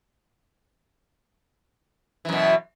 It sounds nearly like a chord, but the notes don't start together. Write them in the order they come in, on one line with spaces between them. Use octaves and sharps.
E3 F#2 B2